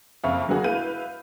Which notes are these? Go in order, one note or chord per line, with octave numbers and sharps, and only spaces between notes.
F#1 F2 E5 F5 C#6 F6
D3 F#3 A#3 B3 F#4 G#4
E4 B4 F5 G6 D#7